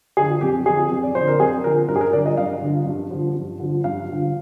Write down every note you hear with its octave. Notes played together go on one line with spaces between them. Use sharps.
D3 F3 G#4
F2 G4
D3 F3 G#4
F2
D5
D3 F3 C5
A#4
F2 G#4
D3 F3 A#4
G2 A#4
G#4
A#4
D3 F3 D5
D#5
G2 F5
D3 F3
G2
D3 F3
G2
D3 F3
G2 F5
D3 F3